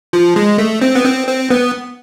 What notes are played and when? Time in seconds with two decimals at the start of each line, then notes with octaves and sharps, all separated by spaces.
0.13 F3
0.36 G#3
0.58 A3
0.82 C4
0.95 B3
1.05 C4
1.27 C4
1.51 B3